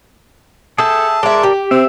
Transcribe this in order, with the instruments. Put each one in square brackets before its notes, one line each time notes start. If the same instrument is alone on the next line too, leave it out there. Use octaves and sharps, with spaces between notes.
[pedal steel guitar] G#4 E5 G5 [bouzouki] A4 [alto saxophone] A5
[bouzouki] G#3 E5 [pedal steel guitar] A#4 D5
[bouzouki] G4
[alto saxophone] C4 [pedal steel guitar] E5